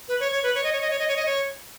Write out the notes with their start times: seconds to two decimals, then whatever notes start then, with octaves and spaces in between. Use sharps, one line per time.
0.09 B4
0.20 C#5
0.32 C#5
0.43 B4
0.55 C#5
0.64 D#5
0.72 C#5
0.81 D#5
0.90 C#5
0.99 D#5
1.08 C#5
1.16 D#5
1.26 C#5